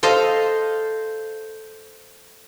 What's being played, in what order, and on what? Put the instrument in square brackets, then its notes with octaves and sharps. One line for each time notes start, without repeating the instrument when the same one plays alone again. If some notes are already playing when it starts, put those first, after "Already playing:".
[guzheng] A4 C5 D#5 F5